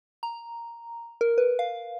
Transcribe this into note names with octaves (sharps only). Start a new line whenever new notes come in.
A#5
A#4
B4
F5